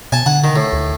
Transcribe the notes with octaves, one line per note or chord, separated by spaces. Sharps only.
B2 G#5 A5
D3 F#5
D#3
A2
D2